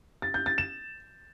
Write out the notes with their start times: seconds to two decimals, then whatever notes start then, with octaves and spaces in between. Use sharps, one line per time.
0.22 A6
0.34 G6
0.46 A6
0.58 E7